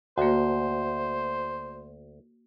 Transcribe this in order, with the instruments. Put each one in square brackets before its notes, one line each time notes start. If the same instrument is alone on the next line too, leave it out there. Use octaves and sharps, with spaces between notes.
[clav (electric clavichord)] D2 [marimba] A#3 F#4 [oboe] C5